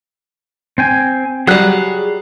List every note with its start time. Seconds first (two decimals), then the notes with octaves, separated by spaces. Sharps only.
0.78 C4 G5 G#5
1.47 F#3 G3 G#4 C#5 F#6